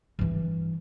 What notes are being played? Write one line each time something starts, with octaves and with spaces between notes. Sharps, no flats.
G2 E3